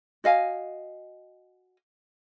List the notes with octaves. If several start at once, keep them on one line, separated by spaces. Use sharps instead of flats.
F#4 D#5 F5 G#5